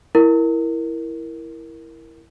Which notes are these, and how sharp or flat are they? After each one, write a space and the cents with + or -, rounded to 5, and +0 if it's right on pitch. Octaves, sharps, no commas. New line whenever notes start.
E4 +0 A#4 +0